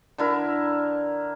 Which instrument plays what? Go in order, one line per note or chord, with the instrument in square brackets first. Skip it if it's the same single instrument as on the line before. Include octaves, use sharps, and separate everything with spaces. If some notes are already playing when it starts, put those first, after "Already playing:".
[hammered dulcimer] D3 E4 A#4